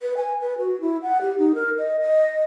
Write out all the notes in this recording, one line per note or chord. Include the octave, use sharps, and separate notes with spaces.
B4
G#5
B4
F#4
E4
F#5
G4
D#4
A#4
D#5
D#5